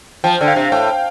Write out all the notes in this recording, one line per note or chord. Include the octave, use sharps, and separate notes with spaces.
F3 G5
D3
F5
C3
A2 G5